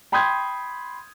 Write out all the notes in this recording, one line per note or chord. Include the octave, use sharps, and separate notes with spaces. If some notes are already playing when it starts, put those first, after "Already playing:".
G5 B5 C6 D#6 G6 G#6